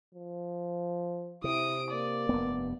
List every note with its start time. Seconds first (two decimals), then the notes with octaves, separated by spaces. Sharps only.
0.15 F3
1.44 C3 E4 D#6 D7
1.91 A#3 D5
2.29 F1 G2 B3